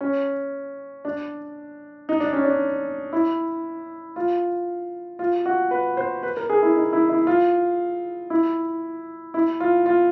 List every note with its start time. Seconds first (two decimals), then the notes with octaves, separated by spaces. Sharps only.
0.01 C#4
1.05 D4
2.09 D#4
2.20 D4
2.33 C#4
2.45 D4
3.13 E4
4.16 F4
5.19 F4
5.46 F#4
5.71 B4
5.97 C5
6.23 B4
6.37 A#4
6.50 G#4
6.62 E4
6.76 D#4
6.93 E4
7.09 E4
7.27 F4
8.30 E4
9.34 E4
9.60 F4
9.86 F4